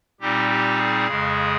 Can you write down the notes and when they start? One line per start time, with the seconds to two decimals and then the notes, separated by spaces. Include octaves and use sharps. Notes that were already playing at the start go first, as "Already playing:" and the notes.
0.20 A#2 G3 C4 D#4 G4
0.50 G4
0.79 G#4
1.06 F2 C#3 G#3